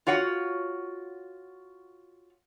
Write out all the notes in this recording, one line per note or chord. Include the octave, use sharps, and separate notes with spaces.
F4 F#4 C#5 F#5